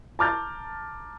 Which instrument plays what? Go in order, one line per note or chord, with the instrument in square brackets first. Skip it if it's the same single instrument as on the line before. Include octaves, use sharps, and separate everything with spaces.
[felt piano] A5 A#5 D6 F6 G6 A6